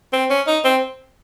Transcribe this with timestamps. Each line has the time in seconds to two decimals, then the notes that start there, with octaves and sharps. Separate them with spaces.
0.13 C4
0.30 C#4
0.47 D#4
0.65 C4